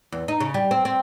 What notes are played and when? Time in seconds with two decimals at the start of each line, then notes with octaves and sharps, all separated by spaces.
0.12 E2
0.28 D#4
0.40 C#3
0.54 G3
0.71 C4
0.85 C4